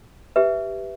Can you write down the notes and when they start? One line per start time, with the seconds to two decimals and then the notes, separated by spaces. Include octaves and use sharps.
0.36 G4 B4 E5